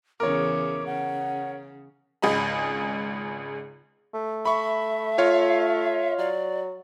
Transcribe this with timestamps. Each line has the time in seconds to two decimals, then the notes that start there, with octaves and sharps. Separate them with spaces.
0.20 E2 C#3 A#4 C#5 D6
0.86 C#3 F#5
2.22 G#1 C#2 G#4 D#5 B5
4.14 A3
4.45 E5 B5 C#6
5.18 F4 C#5 F5
6.18 F#3 D5